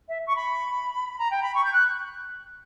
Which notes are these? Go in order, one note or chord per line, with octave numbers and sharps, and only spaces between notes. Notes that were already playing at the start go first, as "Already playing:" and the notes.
E5
C#6
B5
A#5
G5
B5
C#6
G6
F#6